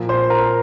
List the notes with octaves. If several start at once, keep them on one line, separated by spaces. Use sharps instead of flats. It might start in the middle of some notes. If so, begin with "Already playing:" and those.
Already playing: A#2 F3 A#3
C5 C6
A#4 A#5